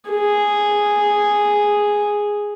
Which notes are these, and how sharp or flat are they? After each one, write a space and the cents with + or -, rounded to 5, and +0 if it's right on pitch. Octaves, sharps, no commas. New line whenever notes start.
G#4 -5